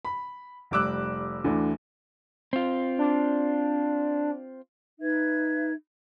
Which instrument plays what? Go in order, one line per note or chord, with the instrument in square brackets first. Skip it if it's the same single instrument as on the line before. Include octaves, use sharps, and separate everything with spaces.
[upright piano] B5
F1 G3 D6 E6 F#6
D2 D3 E3
[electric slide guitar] C4 F4
[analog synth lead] D4
[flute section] D#4 B4 E5 G#6